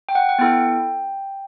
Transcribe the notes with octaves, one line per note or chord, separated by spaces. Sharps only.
G5
F#5
F#5
B3 E4 A4 G5